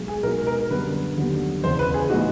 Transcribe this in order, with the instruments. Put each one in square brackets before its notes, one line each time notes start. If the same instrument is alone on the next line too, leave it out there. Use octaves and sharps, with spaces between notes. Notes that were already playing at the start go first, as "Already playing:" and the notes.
Already playing: [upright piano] B1 G#3
[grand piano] G#4
[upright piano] B2 G#3 B3 D#4 F#4 [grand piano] A#4
[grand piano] A#4
[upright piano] F#2 D3 G3 B3 D4 [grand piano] B4
[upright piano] D#2 D3 F#3 B3
[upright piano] E1 E2 C#3 [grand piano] C5
[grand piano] B4
G#4
[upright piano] A2 F#3 B3 D#4 [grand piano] F#4